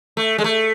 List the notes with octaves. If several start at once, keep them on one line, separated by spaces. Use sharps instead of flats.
A3
G#3
A3